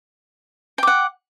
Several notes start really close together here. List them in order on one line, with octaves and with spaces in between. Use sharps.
G5 D6 F#5